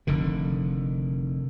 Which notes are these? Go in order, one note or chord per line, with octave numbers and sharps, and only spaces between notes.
F1 D3 D#3